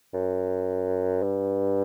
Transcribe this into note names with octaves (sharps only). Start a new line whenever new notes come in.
F#2
G2